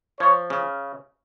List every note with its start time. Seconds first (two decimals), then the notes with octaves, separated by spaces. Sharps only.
0.20 F3 C#5
0.50 C#3